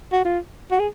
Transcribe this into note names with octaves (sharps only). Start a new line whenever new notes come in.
F#4
F4
F#4
G#4